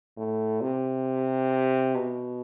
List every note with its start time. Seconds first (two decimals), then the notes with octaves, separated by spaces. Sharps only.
0.17 A2
0.61 C3
1.95 B2